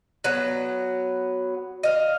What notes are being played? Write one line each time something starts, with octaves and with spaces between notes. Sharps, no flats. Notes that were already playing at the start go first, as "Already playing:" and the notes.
F#3 B3
D#5 F5